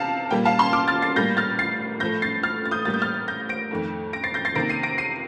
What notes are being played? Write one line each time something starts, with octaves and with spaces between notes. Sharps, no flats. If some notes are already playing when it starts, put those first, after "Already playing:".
Already playing: C3 F5 A5
A#2 G3 A#3 G5
F5 A5
A5 C6
D6 F6
F6 A6
A6 C7
A2 G3 A#3 G6 A#6
F6 A6
A6 C7
A2 F3 A3 G6 A#6
A6 C7
F6 A6
A6
D#6 G6
A2 G3 A#3 A6
G6
F6 A6
G6 A#6
A#6 D7
F2 D#3 A3
A#6 D7
A6 C7
G6 A#6
A6 C7
C3 D#3 A#3 A#6 D7
C7 D#7
A#6 D7
C7 D#7